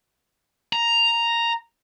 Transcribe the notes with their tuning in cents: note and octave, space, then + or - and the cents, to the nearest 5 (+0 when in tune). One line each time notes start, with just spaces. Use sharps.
A#5 +0